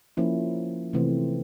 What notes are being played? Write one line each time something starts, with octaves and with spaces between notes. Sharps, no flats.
F3 A#3 C#4 E4
C3 E3 A3 C4